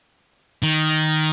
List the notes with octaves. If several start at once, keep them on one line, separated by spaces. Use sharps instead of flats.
D#3